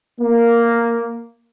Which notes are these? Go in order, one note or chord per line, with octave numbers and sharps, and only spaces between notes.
A#3